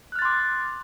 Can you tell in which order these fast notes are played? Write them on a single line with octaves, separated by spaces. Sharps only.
F#6 F6 A6 C6 D6